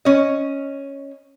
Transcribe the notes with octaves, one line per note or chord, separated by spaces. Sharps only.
C#4 D#5